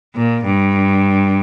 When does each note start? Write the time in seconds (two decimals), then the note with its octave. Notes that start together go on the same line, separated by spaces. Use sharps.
0.16 A#2
0.45 G2